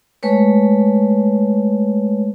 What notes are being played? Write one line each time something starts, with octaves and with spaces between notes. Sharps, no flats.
G#3 A3 B4 C#5